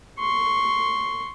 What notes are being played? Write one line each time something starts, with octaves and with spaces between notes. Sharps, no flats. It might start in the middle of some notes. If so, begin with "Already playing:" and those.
C6 C#6